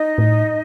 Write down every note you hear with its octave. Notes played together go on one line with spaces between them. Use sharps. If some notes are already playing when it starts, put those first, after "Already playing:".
Already playing: D#4 D#5
A2